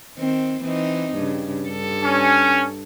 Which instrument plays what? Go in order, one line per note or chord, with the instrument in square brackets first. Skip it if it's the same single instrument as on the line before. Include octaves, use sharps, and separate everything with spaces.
[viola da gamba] D#3 C4
E3 C4 D#4
G2 C#3
G2 A4
[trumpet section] C#4